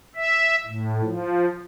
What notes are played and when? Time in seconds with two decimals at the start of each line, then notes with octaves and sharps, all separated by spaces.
0.16 E5
0.66 A2
1.03 F3